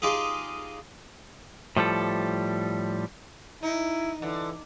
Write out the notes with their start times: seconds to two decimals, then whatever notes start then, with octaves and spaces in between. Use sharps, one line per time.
0.02 D#4 F4 G4 G#4
1.77 A2 F3 G3 A4
3.63 D#4 E4
4.22 D3 E3